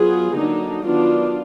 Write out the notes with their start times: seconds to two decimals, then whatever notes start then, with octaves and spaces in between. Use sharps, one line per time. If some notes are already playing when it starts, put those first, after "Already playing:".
Already playing: F#3 B3 F4 G#4
0.34 D3 F#3 A#3 D4 D#4
0.83 D#3 F#3 B3 D4 F4